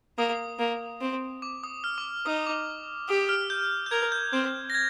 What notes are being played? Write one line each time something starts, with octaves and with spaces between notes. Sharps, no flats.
A#3 D#6
A#3
C4
D6
D#6
F6
D6
D#4 D#6
D6
G4 D#6
F6
G6
G6
A#4 G#6
G6
C4 G6
A#6
G#6